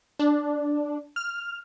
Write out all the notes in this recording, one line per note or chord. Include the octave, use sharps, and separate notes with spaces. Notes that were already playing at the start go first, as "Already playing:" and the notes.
D4
F6